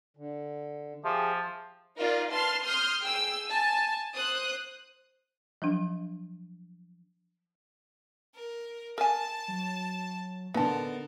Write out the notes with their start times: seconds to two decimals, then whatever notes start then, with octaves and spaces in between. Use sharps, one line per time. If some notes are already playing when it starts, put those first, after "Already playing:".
0.17 D3
1.05 F3 G4 G#4 E5
1.97 D#4 F4 A#4 D5
2.30 B4 A5 C6 F6
2.63 C6 D#6 F6 G6
3.00 G#4 G5 E6
3.46 G#5 A5
4.14 C5 D#6 F#6
5.62 F3 F#3 D4
8.34 A#4
8.98 A#4 G#5 A5
9.48 F#3
10.54 D3 B3 D#4 A4 A#4 A5